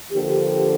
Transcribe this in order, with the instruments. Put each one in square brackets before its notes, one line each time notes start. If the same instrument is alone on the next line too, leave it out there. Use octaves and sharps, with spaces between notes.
[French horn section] D3 F3 A#3 G4